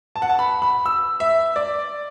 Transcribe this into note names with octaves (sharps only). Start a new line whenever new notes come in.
A5
F#5
A5
B5
B5
E6
E5
D5